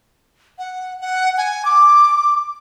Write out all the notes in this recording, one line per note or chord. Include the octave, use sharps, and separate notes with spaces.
F#5
F#5
G#5
D6